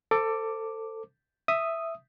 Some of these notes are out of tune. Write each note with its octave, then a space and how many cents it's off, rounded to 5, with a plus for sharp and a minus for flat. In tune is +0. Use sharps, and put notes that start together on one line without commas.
A4 +20 C5 +0 D6 +0
E5 +0 D#6 +0